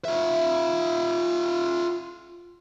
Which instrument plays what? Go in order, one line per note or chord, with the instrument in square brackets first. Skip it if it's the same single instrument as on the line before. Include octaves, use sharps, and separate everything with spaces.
[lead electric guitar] F4 E5